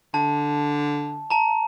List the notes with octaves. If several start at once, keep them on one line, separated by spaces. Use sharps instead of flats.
D3 A5
A5 A#5